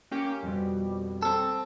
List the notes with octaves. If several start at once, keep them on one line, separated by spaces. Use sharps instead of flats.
A#3 C#4 G4
F2 B2 G3
C4 A4